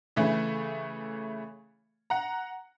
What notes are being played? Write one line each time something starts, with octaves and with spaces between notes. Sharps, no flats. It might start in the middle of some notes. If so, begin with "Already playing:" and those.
C#3 E3 A3
F#5 A#5